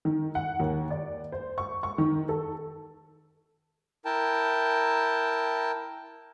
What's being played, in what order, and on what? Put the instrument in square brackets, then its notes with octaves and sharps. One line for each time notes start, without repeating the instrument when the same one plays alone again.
[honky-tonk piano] D#3
F#5
D#2
D5
C5
C#6
C#6
D#3
A4
[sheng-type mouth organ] E4 A#4 G5 A5